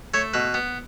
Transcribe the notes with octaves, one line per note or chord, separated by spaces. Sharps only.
A3 C#5
B2 B4
B3